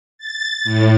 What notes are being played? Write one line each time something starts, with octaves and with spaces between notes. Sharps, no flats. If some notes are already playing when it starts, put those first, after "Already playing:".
A6
A2